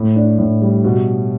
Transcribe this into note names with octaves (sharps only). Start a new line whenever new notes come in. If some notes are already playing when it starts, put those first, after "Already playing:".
Already playing: A2
D4
A2
G3
B2